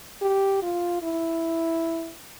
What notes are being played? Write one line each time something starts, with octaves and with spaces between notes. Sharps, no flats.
G4
F4
E4